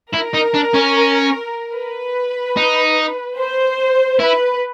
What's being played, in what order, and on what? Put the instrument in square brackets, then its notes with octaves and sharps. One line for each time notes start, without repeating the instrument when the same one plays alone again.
[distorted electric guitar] E4 [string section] A#4
[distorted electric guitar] D#4
D4
C#4
[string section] B4
[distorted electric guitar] D#4
[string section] C5
[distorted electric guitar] E4 [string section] B4